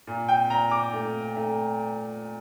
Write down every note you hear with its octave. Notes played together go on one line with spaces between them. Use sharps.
A#2
G5
A#2 A#5
D6
A3
A3